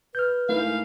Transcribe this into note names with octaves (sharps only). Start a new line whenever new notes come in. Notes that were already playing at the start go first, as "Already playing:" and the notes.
B4 F6 G6
G#2 A3 E4 A#4 F5